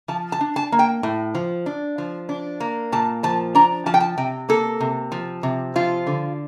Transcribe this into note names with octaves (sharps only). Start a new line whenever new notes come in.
F3 A5
A5
D4
A5
A#3
G5
A2
F3
D4
F3
D4
A#3
A#2 A5
F3 A5
D4 A#5
F3 A5
G5
A5
C3 G5
A#3 A4
C3
F3
C3
F3 F4
D3